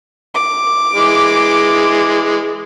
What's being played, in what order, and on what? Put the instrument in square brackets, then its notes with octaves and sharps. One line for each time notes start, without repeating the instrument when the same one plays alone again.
[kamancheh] D6
[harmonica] E3 G#3